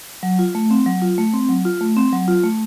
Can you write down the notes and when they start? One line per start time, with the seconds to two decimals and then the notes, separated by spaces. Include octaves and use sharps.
0.23 F#3
0.39 F4
0.55 A3
0.70 C4
0.86 F#3
1.02 F4
1.18 A3
1.34 C4
1.49 F#3
1.65 F4
1.81 A3
1.97 C4
2.12 F#3
2.28 F4
2.44 A3